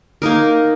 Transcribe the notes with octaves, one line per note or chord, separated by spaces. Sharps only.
A#3 D#4 A#4